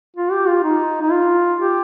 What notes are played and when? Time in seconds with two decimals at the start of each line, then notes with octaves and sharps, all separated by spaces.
0.16 F4
0.32 G4
0.47 F4
0.64 D#4
1.02 D#4
1.11 F4
1.59 G4